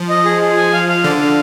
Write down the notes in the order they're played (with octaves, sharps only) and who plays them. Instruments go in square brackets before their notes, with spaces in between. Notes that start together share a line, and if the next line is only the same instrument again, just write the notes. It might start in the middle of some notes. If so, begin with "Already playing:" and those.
Already playing: [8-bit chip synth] F3
[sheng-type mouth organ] D#5
G#4
G#4
G#5
F5
F5
[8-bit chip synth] D3 [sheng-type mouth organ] D5
[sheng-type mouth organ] F5